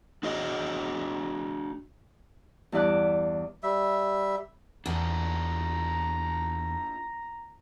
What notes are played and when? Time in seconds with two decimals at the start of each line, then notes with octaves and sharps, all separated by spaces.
0.23 D4 F#4 G#4 D#5
2.72 E2 G2 E4 D5 F#6
3.63 G3 E5
4.86 E2 D4 F4 A4 A#5